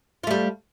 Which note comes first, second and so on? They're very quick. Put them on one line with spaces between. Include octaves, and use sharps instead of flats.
F4 A3 G3